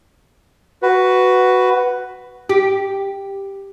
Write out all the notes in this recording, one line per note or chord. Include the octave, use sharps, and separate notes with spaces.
F#4 B4
G4